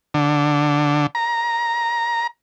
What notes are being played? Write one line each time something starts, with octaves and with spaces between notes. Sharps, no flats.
D3
A#5